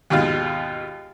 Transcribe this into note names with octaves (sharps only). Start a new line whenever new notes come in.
D#2 G#2 B2 F4